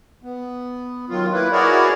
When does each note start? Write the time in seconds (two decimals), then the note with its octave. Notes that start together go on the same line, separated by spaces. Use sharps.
0.23 B3
1.10 D#3 F#3 F4
1.32 A#3 E4 B4
1.52 E4 F#4 G#4 A#4 C#5 D5